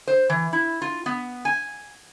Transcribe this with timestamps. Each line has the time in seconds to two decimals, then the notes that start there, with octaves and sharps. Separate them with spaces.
0.07 C5
0.30 E3
0.53 E4
0.82 F4
1.06 B3
1.45 G#5